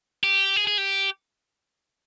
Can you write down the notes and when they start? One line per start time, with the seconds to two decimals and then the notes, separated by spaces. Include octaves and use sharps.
0.24 G4
0.56 G#4
0.67 G#4
0.78 G4